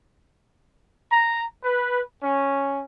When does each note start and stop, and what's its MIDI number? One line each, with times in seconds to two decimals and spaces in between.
1.11 1.43 82
1.63 1.99 71
2.21 2.81 61